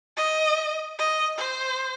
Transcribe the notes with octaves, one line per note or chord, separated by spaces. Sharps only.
D#5
D#5
C5